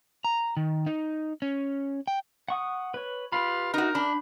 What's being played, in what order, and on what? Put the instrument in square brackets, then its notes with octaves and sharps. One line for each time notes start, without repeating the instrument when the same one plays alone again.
[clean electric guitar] A#5
D#3
D#4
C#4
G5
[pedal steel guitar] F#5 C#6 D#6
B4 C#5
[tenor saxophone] F4 [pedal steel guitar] G4 B4 B5
[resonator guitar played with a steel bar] D#4 F#4 [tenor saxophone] A#4
[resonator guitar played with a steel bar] D4 [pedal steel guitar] B5